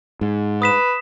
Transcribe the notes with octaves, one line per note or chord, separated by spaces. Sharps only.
G#2
B4 D#6 B6 E7